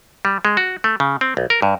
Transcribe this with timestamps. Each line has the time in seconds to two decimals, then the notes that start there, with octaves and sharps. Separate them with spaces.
0.25 G3
0.45 G#3
0.57 F#4
0.84 A3
1.00 C#3
1.21 C4
1.37 B1
1.50 A#4
1.62 G2